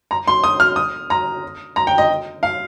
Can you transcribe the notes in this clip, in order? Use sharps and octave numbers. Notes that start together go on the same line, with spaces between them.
A#5
C6
D#6
F6
D#6
A#5
A#5
G5
D#5
F5